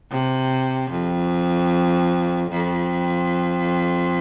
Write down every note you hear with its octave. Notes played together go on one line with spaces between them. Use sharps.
C3
F2
F2